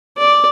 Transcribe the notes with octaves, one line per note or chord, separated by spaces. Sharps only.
D5